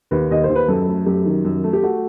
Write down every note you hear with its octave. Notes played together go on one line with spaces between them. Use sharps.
D#2 B4
D#2 D#5
C5
D#2
B4
F#2 A4
A3
F#2 G4
D#3
F#2
A3
G4
A3 F#4